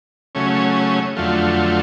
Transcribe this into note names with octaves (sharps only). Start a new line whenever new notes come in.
C#3 F#3 A3 C#4
F2 D3 F#3 A3 F4